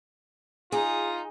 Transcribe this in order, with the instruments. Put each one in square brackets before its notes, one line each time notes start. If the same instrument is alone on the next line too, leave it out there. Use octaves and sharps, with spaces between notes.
[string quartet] D#4 [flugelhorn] F4 [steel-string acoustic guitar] G#4